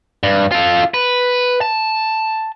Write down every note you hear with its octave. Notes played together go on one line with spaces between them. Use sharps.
G2
F4 A4
B4
A5